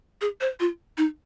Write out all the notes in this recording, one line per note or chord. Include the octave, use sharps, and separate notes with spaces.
G#4
C5
F4
D#4